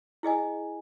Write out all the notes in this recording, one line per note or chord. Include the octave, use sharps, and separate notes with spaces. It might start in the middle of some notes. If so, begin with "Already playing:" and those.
E4 G#4 D#5 G#5